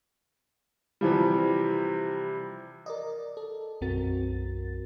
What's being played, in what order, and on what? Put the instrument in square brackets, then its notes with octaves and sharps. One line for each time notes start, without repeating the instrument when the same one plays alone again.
[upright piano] C3 E3 F3 G3
[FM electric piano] A#4 D5 D#5
A4
B1 F#2 C4 F#4 A#4 A6